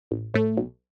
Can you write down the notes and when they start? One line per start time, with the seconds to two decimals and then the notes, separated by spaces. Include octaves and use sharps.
0.11 A1
0.34 A2 A3
0.57 B1